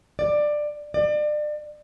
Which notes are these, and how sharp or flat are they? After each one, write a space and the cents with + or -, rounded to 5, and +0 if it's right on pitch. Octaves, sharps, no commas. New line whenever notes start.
D5 +15
D5 +35